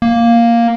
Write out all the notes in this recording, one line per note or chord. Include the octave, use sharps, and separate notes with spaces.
A#3